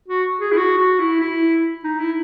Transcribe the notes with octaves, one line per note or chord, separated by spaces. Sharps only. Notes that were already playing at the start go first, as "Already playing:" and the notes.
F#4
G#4
E4
F#4
F#4
E4
E4
D#4
E4